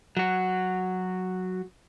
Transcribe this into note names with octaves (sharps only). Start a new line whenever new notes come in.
F#3 F#4